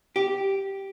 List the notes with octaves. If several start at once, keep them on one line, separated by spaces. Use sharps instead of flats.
G4